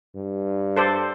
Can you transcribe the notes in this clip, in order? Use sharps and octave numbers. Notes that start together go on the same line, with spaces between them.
G2
A4 C5 D5